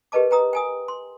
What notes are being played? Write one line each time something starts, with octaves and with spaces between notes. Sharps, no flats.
G4 A#4 B4 D#5 A5 D6
B4 G5 A#5 D#6
G5 G#5 D#6
C6